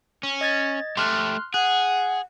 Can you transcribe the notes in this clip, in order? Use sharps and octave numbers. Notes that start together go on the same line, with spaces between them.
C#4
D#5 G#6 A6
A3 G4 C6 F6 F#6
G#4 F#5 F#6